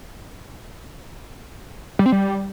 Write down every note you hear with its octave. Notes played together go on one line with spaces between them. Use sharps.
G3
C4
G3